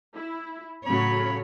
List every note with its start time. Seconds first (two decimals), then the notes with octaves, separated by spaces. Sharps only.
0.15 E4
0.86 A2 C#3 F#3 A3 C#5 B5